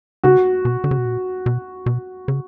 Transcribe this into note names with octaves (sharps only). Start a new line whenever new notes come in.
C#3 F#4
B2
D3
C#3
B2
A#2
B2
B2
C#3